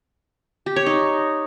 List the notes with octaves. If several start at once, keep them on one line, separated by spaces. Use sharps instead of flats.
G4
C#5
D#4